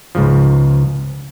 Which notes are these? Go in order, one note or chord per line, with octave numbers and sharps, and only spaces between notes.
C#2 G#2 C#3 F3